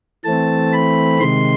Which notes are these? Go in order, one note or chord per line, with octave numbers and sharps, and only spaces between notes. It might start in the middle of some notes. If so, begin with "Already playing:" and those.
E3 A3 C4 A5
B5
C3 D#3 G#3 C6